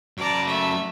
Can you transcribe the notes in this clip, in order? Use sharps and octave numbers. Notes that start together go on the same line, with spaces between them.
F#2 D5 A5 A#5
A3 E5